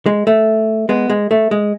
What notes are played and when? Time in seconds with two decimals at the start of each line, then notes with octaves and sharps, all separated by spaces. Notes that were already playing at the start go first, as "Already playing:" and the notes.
0.06 G#3
0.27 A3
0.89 G#3 B3
1.10 G#3
1.31 A3
1.51 G#3